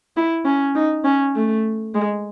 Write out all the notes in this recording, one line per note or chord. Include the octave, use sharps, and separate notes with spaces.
E4
C#4
D#4
C#4
A3
G#3